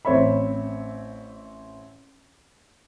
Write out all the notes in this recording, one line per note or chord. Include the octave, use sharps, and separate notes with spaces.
A1 C4 C#5 E5 B5